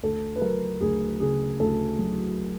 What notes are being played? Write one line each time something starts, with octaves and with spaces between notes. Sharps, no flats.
D2 A4
B4
F#3 A#4
D2 G#4
C#3 G#4
D2 A4
F#3